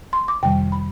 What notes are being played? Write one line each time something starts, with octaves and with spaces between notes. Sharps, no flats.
C6
D6
F2 C3 D#3 G3 G5
B5